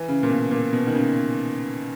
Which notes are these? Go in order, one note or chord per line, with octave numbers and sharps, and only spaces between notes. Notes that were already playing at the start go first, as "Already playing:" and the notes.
Already playing: E3
C#3
A#2
B2
A#2
B2
D#3
C#3